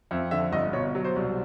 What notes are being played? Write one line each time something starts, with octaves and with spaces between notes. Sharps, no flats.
F2 E5
D3 E5
G1 D#5
B2 C#5
F#3
C5
C2